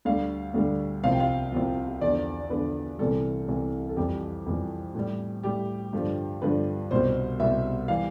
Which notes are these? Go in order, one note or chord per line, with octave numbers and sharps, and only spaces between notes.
D2 D3 G3 F5
D2 D3 G3
C2 C3 F3 F5
G5
F5
C2 C3 F3
E2 D3 F3 D5
E2 D3 F3 B4
C2 C3 E3 G3 A4
C2 C3 E3 G3
A4
F2 E3 G3 G4
F2 E3 G3
A2 G3
A2 G3 G4
G2 D3 F3
G2 D3 F3 B4
C2 B2 G3 C5
C2 B2 G3 E5
E3 G3 F5